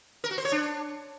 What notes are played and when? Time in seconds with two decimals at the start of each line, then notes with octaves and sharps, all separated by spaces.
0.24 A#4
0.31 F#4
0.38 C5
0.45 C#5
0.52 D4